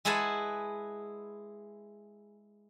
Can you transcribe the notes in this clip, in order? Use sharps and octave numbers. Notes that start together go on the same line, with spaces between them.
G#3 E4 G#4 B4 F#5 A5